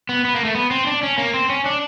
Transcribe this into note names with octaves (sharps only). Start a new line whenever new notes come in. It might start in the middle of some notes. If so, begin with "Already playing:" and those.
B3
B3
A#3
A3
B3
C4
D4
C#4
A#3
C4
C#4
D4